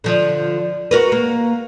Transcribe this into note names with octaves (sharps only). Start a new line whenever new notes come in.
D3 F3
F#4 A#4 B4
A#3